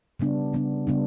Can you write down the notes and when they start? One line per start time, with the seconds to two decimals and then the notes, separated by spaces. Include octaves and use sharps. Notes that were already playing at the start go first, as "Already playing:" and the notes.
0.20 C#3 G3 B3 D4
0.53 C#3 G3 B3 D4
0.87 C#3 G3 B3 D4